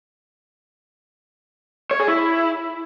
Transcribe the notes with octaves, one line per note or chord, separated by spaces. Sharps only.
C#5
G#4
E4